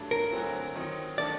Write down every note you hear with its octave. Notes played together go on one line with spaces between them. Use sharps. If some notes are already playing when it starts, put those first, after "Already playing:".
Already playing: G2 F#3 A3 D4
A#4
D2 D3 F#3 C4 F#4
D#3 F#3 C4 D#4
D#3 A3 D4 D5